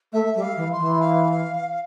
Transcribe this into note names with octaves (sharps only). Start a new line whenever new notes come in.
A3 E5
G3
F5
E3
C6
E3
F5